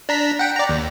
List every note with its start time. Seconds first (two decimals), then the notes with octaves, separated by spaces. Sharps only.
0.09 D4 A#5 B6
0.39 F#5 G5
0.56 D5 A#5
0.69 D#2